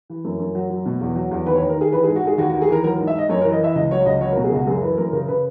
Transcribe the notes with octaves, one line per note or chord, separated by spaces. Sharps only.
E3
F#2
F#2
F#3
F#3
B2
E2
F#3
E2
D#2 B4
C#5
B4
D#2
A#4
D#3 G#4
E3 B4
G#4
G#2
F#4
G#2 G#4
D#2 F#4
F#4
D#2
G#4
E3 A#4
F#3 A#4
G#2
E5
G#2 D#5
F#2 C#5
A#4
E3
D#5
E3 E5
C#2 D#5
F#3 C#5
C#2 D#5
F#3 C#5
A#4
B2
G#4
C#2 F#4
F#2 G#4
E3 B4
F#2 A#4
C#3 A#4
C#3 B4